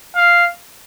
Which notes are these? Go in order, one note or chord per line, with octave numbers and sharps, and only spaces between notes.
F5